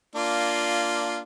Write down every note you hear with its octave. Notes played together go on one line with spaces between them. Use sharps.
A#3 D4 F4